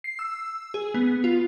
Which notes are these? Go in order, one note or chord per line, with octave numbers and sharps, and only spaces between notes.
C7
E6
G#4
B3
F4